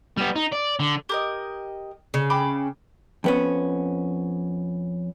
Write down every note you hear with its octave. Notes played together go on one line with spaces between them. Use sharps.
G3 B3
D#4
D5
D3
G4 A#4 D#5
C#3
G5 B5 D6
F2 B3 C#4